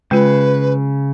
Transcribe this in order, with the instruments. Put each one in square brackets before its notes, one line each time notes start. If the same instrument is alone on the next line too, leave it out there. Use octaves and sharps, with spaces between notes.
[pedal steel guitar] C#3 [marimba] G#3 F4 [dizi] B4